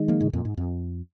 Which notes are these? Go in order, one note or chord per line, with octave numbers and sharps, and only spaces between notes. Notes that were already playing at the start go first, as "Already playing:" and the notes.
Already playing: D#3 G#3 D#4
F3 A#3
G#2 C#3
F2 A#2
G#2
F2